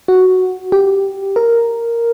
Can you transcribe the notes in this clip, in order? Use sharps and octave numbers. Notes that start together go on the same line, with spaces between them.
F#4
G4
A#4